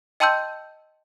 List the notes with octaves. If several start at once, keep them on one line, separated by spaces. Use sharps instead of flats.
D#5 G5 A5 C6 E6 G6